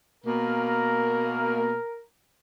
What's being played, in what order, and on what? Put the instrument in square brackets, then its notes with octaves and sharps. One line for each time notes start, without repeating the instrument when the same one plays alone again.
[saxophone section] B2 A#3 [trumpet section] A#4